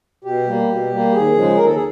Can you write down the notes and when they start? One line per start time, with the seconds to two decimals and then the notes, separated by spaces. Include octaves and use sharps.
0.24 B2 G4
0.47 G3 A#3
0.69 B2
0.91 G3 A#3
1.12 D#2 G#4
1.35 C#3 F3 G#3
1.56 D#2 A#4
1.66 A4
1.75 G#4